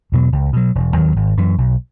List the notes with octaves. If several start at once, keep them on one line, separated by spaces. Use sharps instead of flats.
E2 B2 F#3
C#2
B2 F#3
E1
D#2 D#3 F#3
G#1
F#2 E3
B1